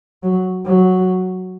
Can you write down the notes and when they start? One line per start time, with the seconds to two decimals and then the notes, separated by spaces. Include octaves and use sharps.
0.23 F#3
0.66 F#3